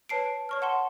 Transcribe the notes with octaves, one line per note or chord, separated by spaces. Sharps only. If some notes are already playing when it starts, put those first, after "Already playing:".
B4 C#5 A5 C7 D7
C#5 C#6 F6
F#5 A5 C6